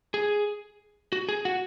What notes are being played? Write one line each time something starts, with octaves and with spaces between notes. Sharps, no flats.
G#4
F#4
G#4
F#4